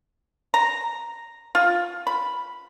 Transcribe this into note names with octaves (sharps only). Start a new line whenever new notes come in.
A#5
F4
B5